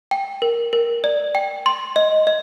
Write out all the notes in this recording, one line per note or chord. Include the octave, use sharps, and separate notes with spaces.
G5
A#4
A#4
D5
G5
C6
D#5
D#5